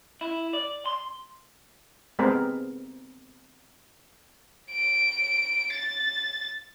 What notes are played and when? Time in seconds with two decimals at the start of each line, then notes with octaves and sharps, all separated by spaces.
0.21 E4
0.53 D5
0.86 C6
2.19 G#3 B3 C4 A#4
4.72 D7
5.74 A6